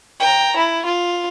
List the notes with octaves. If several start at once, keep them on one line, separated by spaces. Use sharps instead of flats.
G5 A#5
E4
F4